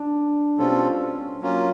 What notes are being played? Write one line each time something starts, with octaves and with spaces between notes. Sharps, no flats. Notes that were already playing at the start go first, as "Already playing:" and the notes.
Already playing: D4
B2 G3 C4 C#4 F4 A4
F#3 A#3 C#4 F4